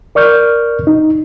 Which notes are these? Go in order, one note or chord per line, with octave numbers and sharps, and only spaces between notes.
A#4 D5 C#6 F6 G6
D#4